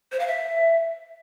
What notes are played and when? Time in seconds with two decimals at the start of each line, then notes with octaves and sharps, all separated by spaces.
0.12 C5
0.19 F5
0.27 E5